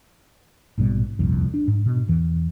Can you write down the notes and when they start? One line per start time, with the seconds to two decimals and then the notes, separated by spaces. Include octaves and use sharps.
0.78 A#1 G#2 B2 G3
1.19 D#1 C2 F2
1.54 D4
1.68 G#2
1.86 B2
2.08 E2 E3